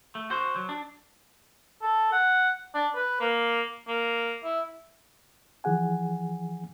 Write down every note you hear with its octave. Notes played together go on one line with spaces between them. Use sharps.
A3
F#4 C5
F#3
D4
A4
F#5
D4
B4
A#3
A#3
E4
E3 F3 G#4 F#5 G#5